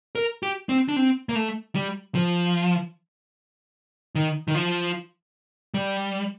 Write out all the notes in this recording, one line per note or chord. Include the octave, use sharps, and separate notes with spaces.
A#4
G4
C4
D4
C4
A#3
A3
G3
F3
D#3
D#3
F3
G3